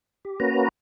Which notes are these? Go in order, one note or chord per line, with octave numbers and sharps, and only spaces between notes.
G4
A#3 C#4 F#4 B4 A#5